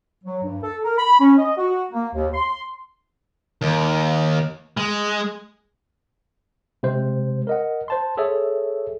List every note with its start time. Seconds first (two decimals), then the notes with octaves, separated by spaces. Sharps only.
0.24 F#3
0.43 G2
0.63 A4
0.84 A#4
0.98 B5
1.20 C#4
1.37 D#5
1.57 F#4
1.92 A#3
2.14 D#2
2.34 C6
3.61 D#2
4.77 G#3
6.83 C3 G#3 C5
7.47 A#4 D#5 F#5
7.88 C5 A5 C6
8.17 G#4 A4 C#5 E5